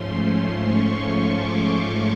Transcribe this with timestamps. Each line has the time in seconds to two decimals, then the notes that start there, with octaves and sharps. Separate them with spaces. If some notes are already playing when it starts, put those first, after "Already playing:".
Already playing: G#2 F3 A3 C#4 C6
0.60 C#6
1.32 D6